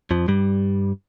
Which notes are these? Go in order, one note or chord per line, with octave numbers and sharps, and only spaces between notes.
F2 F3
G2 G3